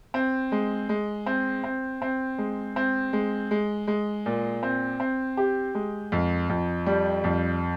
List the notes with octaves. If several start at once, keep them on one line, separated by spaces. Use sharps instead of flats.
C4
G#3
G#3
C4
C4
C4
G#3
C4
G#3
G#3
G#3
A#2
C4
C4
G4
G#3
F2
F2
G3
F2